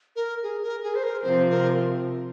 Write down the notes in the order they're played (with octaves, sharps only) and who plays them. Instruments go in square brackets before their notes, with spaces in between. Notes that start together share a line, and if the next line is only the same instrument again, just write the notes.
[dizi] A#4
G#4
A#4
G#4
C5
A#4
[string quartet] C3 F3 C4 [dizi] C5
[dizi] A#4